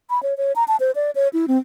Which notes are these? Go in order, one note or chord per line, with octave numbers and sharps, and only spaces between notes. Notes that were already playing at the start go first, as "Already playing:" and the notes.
B5
C#5
C#5
A#5
A5
C5
D5
C#5
E4
C4